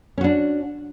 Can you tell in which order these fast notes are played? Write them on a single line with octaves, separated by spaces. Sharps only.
C#4 F#4 D4